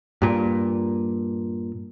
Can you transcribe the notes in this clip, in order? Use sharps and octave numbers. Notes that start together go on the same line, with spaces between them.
G2 A#2